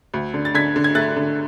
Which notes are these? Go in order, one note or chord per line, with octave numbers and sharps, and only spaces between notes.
D2
D3
A6
D3 G#6 B6
D3
G#6
A3 F#6 A6
D3